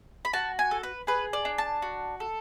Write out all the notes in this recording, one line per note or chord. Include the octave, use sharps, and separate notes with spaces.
B5
F#4 A5
G#5
A4
B4
G#4 B4
D5
D4
A5
F#4
A4